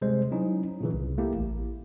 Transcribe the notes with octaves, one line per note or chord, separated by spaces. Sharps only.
C3 G3 G#3 C5
F#3 C#4 D#4 E4
A#2 C#3 E3
C2
A3 A#3 E4 G4
A1